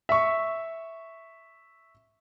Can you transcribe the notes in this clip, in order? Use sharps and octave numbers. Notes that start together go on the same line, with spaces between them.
E5 C#6